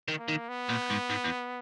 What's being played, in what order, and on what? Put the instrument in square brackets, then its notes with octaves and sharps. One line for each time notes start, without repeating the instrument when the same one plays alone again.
[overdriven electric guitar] D#3
[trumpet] A#3
[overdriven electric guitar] D#3
[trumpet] B3
[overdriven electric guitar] A#2
G#2
G#2
E2